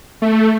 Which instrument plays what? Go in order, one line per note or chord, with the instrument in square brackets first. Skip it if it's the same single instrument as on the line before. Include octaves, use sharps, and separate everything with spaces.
[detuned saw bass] A3